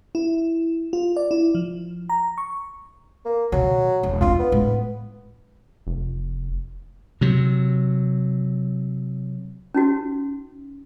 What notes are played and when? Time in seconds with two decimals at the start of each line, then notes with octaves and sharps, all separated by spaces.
0.15 E4
0.93 F4
1.16 D5
1.31 E4
1.55 F3
2.09 A#5
2.38 C#6
3.25 A#3
3.52 B2 D#3 F#3
4.03 E1
4.21 C4 D4 F4
4.39 B3
4.52 A2 G#3
5.87 F1
7.21 C3 F#3
9.74 C#4 D#4 F#4